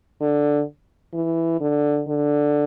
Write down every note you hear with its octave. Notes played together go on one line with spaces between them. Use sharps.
D3
E3
D3
D3